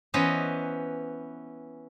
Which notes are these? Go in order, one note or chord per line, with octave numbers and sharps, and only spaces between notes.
E3 B3 C#4 B4 C5 D#5